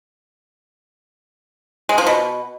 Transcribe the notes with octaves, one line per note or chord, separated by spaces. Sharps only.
G#3
F3
B2